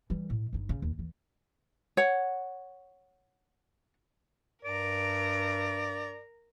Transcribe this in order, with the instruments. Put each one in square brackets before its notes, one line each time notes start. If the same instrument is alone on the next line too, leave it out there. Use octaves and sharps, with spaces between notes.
[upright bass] E3 G3
A2
G1 D#4
C#3
D#2
D#2 E3
[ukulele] C#5 F#5
[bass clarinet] G2 [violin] A#4 A#5 [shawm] D5 [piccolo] D7